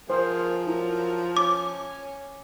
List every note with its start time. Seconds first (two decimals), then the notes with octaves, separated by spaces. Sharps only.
0.10 F3 A#3 G#4 C5
0.67 F#3 E4 A#4
1.37 C#4 D6